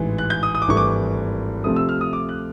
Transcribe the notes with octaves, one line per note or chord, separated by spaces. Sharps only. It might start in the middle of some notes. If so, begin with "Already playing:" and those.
Already playing: A1 G#2 E3
F#6
G6
D#6
D#6
D6
G#1 G2 E3 A3 C#6
D6
D2 C3 F3 A3 D#6
E6
F6
D#6
D6
F#6